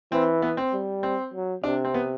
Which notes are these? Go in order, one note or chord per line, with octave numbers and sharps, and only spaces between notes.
E3 C4
B3
C4
G3
C4
F#3
C3 D4
C4
B3